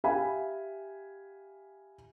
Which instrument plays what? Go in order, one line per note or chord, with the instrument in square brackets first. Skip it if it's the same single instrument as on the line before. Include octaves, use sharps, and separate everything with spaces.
[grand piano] G4 E5 F5 G#5 B5